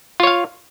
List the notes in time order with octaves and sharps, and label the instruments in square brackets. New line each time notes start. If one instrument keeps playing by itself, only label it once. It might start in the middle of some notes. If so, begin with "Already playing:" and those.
[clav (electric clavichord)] F4
C#5
F5